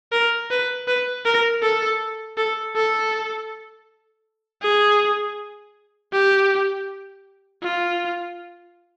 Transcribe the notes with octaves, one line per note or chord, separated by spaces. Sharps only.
A#4
B4
B4
A#4
A4
A4
A4
G#4
G4
F4